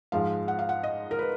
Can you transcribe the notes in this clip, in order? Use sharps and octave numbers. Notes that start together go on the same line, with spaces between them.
G#2 F3 G#3 F5
F#5
F5
F#5
D#5
A#4
B4